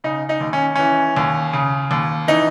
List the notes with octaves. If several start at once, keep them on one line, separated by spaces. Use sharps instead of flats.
C#3 D#4
D#4
D#2
C#4
E3 C#4
D#2
C#3
D#2
E3 D#4